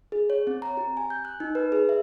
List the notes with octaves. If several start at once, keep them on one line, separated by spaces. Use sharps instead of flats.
G#4
C#5
C4
A#5
G4
G#5
G6
F#6
D#4
B4
G#4
E5